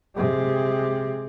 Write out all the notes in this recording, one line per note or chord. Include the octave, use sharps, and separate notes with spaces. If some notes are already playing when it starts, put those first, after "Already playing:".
C3 G#3